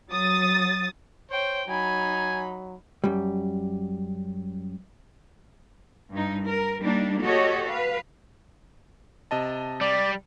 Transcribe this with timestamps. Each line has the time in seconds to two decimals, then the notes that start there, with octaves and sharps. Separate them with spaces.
0.11 F#3 D#6 A6
1.30 C5 C#5 G5
1.69 F#3 D#4 G#5 B5
3.04 F#2 G3
6.13 G2 D#4
6.46 A#4
6.81 G3 A#3 D4 D#4
7.22 F#4 G4 A4 C#5 D#5
7.67 B4 F5
9.31 C3 D#5 A5
9.81 G3 D5